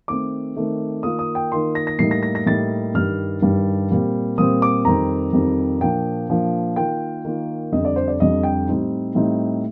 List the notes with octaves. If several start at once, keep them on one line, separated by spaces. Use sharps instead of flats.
D#3 A3 C4 D6
D#3 A3 C4
D#3 A#3 F4 D#6
D#6
G5
D#3 A#3 F4 C6
A#6
A#6
A2 G3 A#3 D#4 C7
A#6
A#6
A#6
A2 G3 A#3 D#4 A6
G2 D#3 G3 F6
G2 D#3 G3
A#2 G3 C4
A#2 G3 C4 D#6
D6
F2 D#3 G3 C4 A#5
F2 D#3 G3 C4
A#2 F3 A#3 D4 G5
A#2 F3 A#3 D4
D#3 A#3 F4 G5
D#3 A#3 F4
F2 D3 G3 D#5
D5
C5
D5
F2 D3 G3 D#5
G5
A2 G3 C4 D#4
A2 G3 C4 D#4